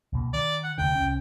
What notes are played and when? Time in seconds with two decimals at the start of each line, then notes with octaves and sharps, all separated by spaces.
0.13 C#2 B2 A#3
0.33 D#3 D5
0.64 F#5
0.78 F1 D2 D3 G5
0.95 C2 C#4